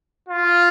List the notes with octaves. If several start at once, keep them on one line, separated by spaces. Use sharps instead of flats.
F4